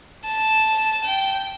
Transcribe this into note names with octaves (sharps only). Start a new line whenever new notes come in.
A5
G5